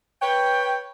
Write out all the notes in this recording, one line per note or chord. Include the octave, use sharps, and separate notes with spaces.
B4 C#5 G5